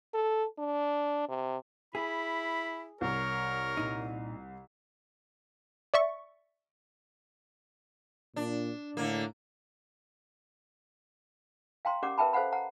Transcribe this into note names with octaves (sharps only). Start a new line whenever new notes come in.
A4
D4
C3
E4 G#4 B5
C2 A#4 C#5
A#2 D#4
D5 E5 C#6
A#2 D4
A2 D3 A#3
F5 G5 A#5 C6
C#4 G4 A#4 D5 F#5 D6
A#4 B4 E5 G5 A5 B5
A4 C5 F5 F#5 B5
F#5 A#5